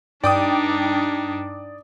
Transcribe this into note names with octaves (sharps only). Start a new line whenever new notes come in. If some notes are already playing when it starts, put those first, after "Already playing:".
G2 D4 D#4 D5 G5 D6 D#6 D7